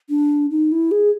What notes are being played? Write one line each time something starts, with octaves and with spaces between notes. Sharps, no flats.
D4
D#4
E4
G#4